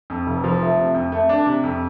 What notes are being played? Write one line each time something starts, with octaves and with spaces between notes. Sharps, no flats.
F2
F1
F3
A3
C3
F2
A3
D4
C3
F2